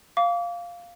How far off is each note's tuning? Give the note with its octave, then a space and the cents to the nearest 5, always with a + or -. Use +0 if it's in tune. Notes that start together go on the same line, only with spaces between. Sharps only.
F5 +0 D6 -35